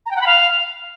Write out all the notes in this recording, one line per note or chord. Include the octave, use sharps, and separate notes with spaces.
A#5
G5
F#5
B5
F5